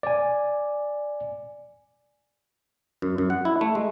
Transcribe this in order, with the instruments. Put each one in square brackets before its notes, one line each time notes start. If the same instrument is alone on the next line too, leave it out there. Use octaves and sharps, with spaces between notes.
[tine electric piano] D5 G#5
[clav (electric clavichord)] F#2
F#2
F#5
E4
A3
G#3